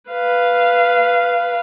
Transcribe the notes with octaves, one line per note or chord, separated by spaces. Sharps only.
B4 F5